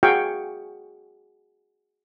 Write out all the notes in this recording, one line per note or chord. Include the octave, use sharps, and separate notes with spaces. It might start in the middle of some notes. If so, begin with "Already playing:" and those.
F#4 G#4 F5 G5 C#6